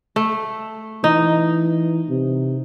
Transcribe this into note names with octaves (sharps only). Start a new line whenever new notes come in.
A3
E3 D#4
C3